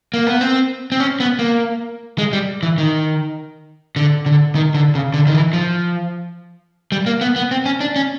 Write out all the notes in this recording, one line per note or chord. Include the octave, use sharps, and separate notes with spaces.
A#3
B3
C4
C4
C#4
B3
A#3
G#3
G3
E3
D#3
D3
D3
D#3
D3
C#3
D3
D#3
E3
F3
G3
A#3
B3
B3
C4
C#4
D4
C#4